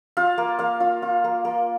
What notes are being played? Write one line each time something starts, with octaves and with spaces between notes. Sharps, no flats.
F4 F5
A#3
A#3 F5
F4
F4
A#3
A#3